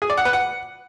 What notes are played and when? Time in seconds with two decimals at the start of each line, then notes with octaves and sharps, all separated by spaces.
0.02 G#4
0.10 D5
0.17 F#5
0.25 B4
0.33 F#5